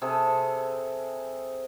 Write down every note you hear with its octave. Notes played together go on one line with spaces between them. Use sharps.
C3 G#4 A4